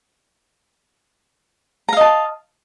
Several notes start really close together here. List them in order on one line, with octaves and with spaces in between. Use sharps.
A#5 F5 D#5 A5